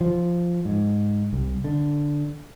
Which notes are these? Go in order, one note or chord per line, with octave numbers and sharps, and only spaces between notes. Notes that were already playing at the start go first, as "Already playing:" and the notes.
F3
G#2
C2
D3